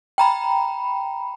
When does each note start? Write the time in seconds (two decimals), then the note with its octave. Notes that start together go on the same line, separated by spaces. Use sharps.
0.18 G5 A#5 B5